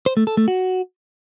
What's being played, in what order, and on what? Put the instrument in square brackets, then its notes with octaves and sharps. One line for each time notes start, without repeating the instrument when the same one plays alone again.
[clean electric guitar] C5
A3
A4
A3
F#4